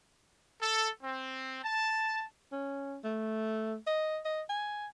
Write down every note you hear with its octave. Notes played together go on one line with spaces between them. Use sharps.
A4
C4
A5
C#4
A3
D#5
D#5
G#5